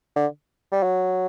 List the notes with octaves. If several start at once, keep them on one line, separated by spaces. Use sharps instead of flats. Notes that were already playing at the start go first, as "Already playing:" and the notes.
D3
G3
F#3